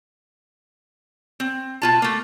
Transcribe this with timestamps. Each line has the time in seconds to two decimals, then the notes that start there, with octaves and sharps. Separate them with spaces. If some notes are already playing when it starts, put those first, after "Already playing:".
1.40 C4
1.82 B2 F4 A5
2.02 A3 A#3